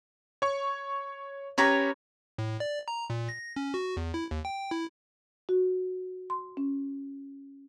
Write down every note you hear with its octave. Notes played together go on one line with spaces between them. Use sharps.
C#5 C#6
C#4 G4 B4 C#5 A#5
A2
D5
A#5
A#2
A#6
C#4
F#4
E2
E4
D#2
G5
E4
F#4
C6
C#4